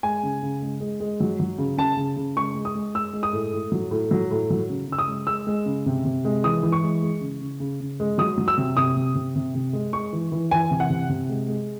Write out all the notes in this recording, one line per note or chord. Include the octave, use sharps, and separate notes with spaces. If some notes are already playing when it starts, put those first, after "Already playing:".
G#3 G#5
C#3
C#3
G#3
G#3
G#3
F#3
F#3
C#3
C#3 A5
C#3
C#3
G#3 C#6
G#3
D#6
G#3
G#3 E6
G#3
D#6
A2
A2
F#3
A2
F#3
A2
F#3
C#3
C#3 E6
D#6
G#3
G#3 E6
G#3
C#3
C3
C3
G#3
E3 D#6
E3
C#6
G#3
G#3
C#3
C#3
C#3
C#3
G#3
F#3 D#6
F#3
E6
C3
C3 D#6
C3
C3
C3
C3
G#3
G#3 C#6
E3
E3
E3 G#5
C3
F#5
C3
C3
G#3
G#3